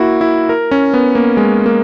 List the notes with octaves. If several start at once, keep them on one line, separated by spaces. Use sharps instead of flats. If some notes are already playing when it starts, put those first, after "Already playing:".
Already playing: A#3 E4 F#4
E4
A#4
C#4
B3
A#3
G#3
A#3